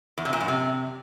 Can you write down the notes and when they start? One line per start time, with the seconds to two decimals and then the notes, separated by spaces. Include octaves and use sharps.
0.18 E2
0.25 C3
0.33 A#2
0.40 F#2
0.48 C3